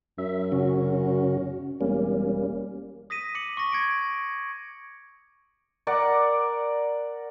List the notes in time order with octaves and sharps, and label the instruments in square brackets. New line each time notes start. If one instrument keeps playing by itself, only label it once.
[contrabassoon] F#2 [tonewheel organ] E5
[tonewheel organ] C#3 C#4 F#4
[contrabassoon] E1 [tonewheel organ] G3 A#3 C#4
[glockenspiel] D#6 A#6 B6 D#7
D6 C#7 F#7
C#6 D6 A#6
G#6 C#7 D7
[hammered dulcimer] A#4 D5 F#5 A#5